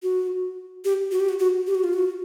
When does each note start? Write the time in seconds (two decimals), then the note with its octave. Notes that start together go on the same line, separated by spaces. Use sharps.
0.03 F#4
0.85 G4
1.12 F#4
1.20 G4
1.29 F#4
1.39 F#4
1.67 G4
1.75 F#4
1.84 F4
1.93 F#4